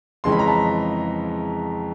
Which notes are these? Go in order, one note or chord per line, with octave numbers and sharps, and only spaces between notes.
F2 C#3 E3 G#3 C6
B5
A#5
A5 B5